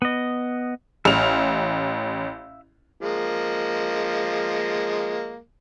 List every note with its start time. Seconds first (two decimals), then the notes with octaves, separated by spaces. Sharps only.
0.02 B3 D#5
1.05 A1 E5 F5 F7
3.01 F3 G#3 A#3